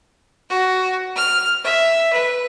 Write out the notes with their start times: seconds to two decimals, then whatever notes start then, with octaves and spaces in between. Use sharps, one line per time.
0.50 F#4
1.16 F6
1.64 E5
2.13 B4